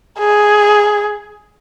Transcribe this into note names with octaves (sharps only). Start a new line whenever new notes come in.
G#4